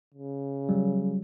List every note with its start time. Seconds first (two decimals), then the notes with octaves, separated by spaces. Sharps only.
0.14 C#3
0.69 F#3 G3